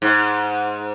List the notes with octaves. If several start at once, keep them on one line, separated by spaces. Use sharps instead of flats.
G#2